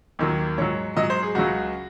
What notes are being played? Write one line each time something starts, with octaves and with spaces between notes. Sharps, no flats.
D#2 D#3 F#3
G#2 F#3 C#5
G#2 F#3 D#5
C5
G#4
C#2 C#3 F#3 F#4